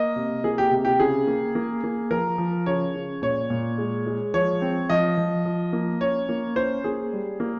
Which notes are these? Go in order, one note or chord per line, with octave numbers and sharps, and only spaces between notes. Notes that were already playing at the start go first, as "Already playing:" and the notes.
Already playing: A#3 D#5
C3
A#3 G#4
G4
C3
G4
C#3 G#4
A#3
A#3
A#3
F3 A#4
F3
C#3 C#5
C#3
A#2 C#5
A#2
G#3
G#3
F3 C#5
C4
F3 D#5
F3
F3
A#3
C#4 C#5
A#3
C#4 C5
A#3 G#4
G3
A#3